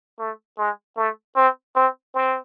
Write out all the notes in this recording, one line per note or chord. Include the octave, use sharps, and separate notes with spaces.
A3
G#3
A3
C4
C4
C4